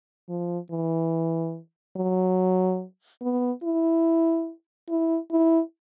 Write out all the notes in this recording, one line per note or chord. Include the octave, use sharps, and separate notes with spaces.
F3
E3
F#3
B3
E4
E4
E4